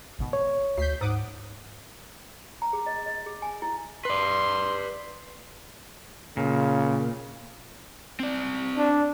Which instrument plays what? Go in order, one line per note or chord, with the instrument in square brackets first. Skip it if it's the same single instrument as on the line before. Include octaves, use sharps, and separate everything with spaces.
[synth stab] G#1 B2
[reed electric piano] C#5
[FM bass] D2 [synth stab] G6 B6 C7
[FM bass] G#2 [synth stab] F#5 D6 D#6
[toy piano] A#5
G#4
D#5
D#5
G#4
G#5
E4
[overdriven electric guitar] B4 D5 [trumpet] C6
[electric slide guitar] A#2 [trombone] C#3
[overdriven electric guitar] C4 D5
[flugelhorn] D4